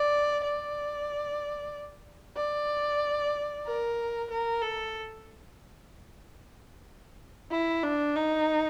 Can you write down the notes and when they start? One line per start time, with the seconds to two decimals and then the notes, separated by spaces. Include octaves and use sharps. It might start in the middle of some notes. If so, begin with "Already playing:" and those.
Already playing: D5
0.44 D5
2.36 D5
3.66 A#4
4.31 A#4
4.62 A4
7.52 E4
7.83 D4
8.16 D#4